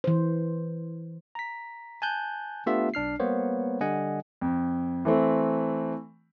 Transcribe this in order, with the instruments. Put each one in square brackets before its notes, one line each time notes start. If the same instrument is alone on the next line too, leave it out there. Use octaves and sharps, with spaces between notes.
[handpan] E3 C5
[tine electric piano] A#5 B6
G#5 A5 F#6 G6
A3 B3 D4 F4 G4 E5
B1 D4 F6 C7
G3 A#3 B3 C5 C#5
D3 G3 D#5 F#5 G#5
[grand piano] F2
E3 A3 C4